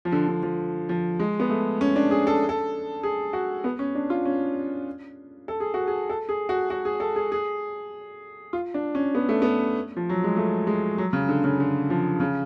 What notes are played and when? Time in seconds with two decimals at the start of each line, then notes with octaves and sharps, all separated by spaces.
0.05 F3
0.12 D3
0.28 D3
0.43 F3
0.89 F3
1.19 G#3
1.40 B3
1.50 A3
1.81 C#4
1.96 D4
2.11 G#4
2.27 A4
2.49 A4
3.03 G#4
3.33 F#4
3.64 B3
3.79 C#4
3.95 D4
4.10 F4
4.25 C#4
5.48 A4
5.60 G#4
5.74 F#4
5.88 G#4
6.09 A4
6.29 G#4
6.49 F#4
6.70 F#4
6.85 G#4
7.00 A4
7.16 G#4
7.32 G#4
8.53 F4
8.74 D4
8.95 C#4
9.15 B3
9.29 A3
9.42 B3
9.97 F3
10.09 F#3
10.24 G#3
10.37 A3
10.67 G#3
10.98 F#3
11.13 C#3
11.29 D3
11.44 C#3
11.60 D3
11.90 F3
12.20 C#3